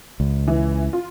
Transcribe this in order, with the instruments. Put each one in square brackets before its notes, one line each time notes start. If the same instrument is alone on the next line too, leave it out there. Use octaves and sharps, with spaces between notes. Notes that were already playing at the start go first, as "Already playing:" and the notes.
[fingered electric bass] C#2
[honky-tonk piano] E3
F4